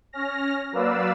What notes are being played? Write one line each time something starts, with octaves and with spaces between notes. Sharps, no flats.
C#4 F6 A#6
F#3 A#3 B4 D5 F5 E6